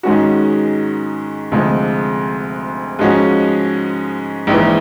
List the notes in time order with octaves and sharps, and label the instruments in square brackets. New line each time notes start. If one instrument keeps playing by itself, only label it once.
[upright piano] G#2 D#3 G#3 C#4 F#4
D2 C3 F3 G#3
G#2 F3 G#3 C#4 F#4
A#1 G#2 E3